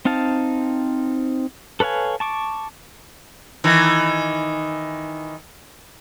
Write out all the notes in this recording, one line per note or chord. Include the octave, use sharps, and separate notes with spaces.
C4 D#4 F5 A5
A4 B4 C#5 F5 G#5
A5 C#6 D6
D#3 E3